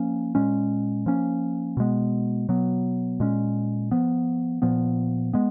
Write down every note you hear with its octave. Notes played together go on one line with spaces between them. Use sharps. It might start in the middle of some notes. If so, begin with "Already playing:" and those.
Already playing: F3 A#3 C#4
A#2 G#3 C#4
F3 A#3 C#4
B2 G#3 B3
B2 F#3 B3
A#2 G#3 C#4
F3 B3
A#2 F3 B3
G#3 B3